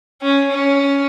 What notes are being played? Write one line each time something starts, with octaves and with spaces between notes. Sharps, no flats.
C#4
C#4